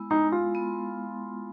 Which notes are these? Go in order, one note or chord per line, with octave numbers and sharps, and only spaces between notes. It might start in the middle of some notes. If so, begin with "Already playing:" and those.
Already playing: G#3 B3 E4
G#3 D#4
G#3 F4
B3